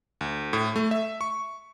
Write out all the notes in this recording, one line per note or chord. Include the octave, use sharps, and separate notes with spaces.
D2
A2
A3
E5
C#6